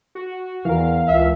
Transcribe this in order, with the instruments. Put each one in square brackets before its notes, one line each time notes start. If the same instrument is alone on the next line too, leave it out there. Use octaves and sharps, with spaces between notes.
[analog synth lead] F#4
[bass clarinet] E2 [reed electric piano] E3 A#4 [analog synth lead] F5
[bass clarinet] C#2 [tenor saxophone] E5